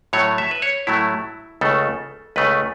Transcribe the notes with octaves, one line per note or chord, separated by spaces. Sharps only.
A2 F#3 A3 C#5
E5
B4
C#5
A2 F#3 A3 E4
C#2 C#3 A3 A4
C#2 C#3 A3 B4